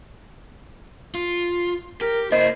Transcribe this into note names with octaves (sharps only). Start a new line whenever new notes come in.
F4
G4 A#4
A#3 E4 C5 D#5